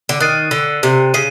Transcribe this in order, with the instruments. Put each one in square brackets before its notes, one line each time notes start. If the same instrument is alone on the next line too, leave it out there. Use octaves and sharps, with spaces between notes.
[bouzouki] D3
[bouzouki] D#3 [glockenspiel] F#6 A6 C7 D#7
[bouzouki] D3
C3
[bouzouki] C#3 [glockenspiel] C7 D#7